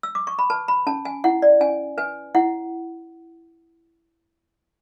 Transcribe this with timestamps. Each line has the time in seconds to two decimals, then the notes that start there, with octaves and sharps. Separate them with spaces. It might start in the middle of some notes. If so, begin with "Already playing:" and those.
0.03 E6
0.15 D6
0.27 C#6
0.39 B5
0.50 B4 A5
0.68 B5
0.87 C#4 A5
1.05 G#5
1.24 E4 F#5
1.42 D5
1.61 C#4 G#5
1.98 B4 G#5
2.35 E4 F#5